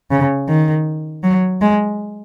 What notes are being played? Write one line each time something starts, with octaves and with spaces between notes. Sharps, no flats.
C#3
D#3
F#3
G#3